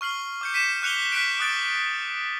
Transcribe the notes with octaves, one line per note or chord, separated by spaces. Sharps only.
C#6 F6 C7 F#7
D6 G6 C#7
B6 C#7 D#7 E7
D6 F#6 C#7 F7 G7
F#6 B6 C#7 D7
D6 D#6 F#6 A6 D7